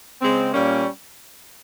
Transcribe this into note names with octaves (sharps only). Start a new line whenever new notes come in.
C#3 G#3 C4
A#2 G3 A#3 C#4